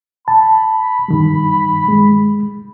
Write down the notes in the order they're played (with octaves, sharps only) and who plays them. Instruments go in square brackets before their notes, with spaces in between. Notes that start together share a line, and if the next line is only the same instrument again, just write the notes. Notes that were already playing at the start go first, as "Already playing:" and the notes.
[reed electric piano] A5 [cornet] B5
[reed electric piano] G2 D#3 G3
G#3